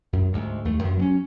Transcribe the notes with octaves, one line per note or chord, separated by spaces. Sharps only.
F#2
D2 G#2
D#2 A3
F#2
F#3 G#3 C#4